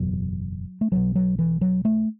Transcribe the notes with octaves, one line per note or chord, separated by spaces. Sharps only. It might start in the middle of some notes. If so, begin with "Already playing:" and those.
Already playing: F#1 E2 B2 F#3
A3
B1 B2 F#3
F#3
E3
F#3
A3